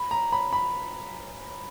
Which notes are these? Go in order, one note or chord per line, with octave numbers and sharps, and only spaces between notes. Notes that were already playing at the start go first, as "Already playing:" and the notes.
Already playing: B5
A#5
B5
B5